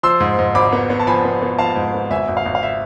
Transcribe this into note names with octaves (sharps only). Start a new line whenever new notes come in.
F3 C6 E6
G#2
G#2
G#1 B5 D6
B3
B3
A5
F3 G#5 B5
B3
B3
F3 F5 A5
G#2
B3
G#1 E5 G#5
G#1
F5
G#1
F5
E5